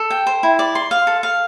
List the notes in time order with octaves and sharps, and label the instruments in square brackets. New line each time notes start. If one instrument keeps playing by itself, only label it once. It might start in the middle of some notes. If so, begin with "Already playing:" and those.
Already playing: [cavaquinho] A4
G5
C5
E4
D5
C6
F5
A4
F5